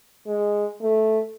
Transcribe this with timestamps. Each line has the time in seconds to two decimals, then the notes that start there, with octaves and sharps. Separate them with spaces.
0.27 G#3
0.82 A3